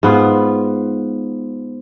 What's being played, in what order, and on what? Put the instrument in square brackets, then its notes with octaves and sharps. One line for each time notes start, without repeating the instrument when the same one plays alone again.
[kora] G#2 B3 F4